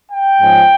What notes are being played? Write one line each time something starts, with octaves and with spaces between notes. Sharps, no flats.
G5
G#2 F3 G#3 C#4